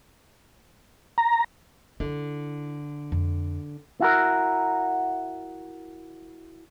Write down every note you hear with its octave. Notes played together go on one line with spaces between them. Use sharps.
A#5
D3 E4
F2
E4 F#4 A#4